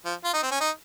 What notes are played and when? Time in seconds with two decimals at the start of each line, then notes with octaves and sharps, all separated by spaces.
0.05 F3
0.25 F4
0.34 D#4
0.43 C4
0.51 C#4
0.61 D#4